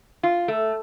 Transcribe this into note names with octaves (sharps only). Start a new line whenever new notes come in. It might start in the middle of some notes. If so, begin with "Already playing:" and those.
F4
A3